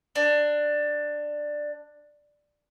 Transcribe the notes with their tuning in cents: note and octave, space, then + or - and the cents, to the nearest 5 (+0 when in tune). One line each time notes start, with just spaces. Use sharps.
D4 +10